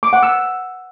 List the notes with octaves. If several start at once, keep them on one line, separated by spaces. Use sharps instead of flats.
D6
F#5
E6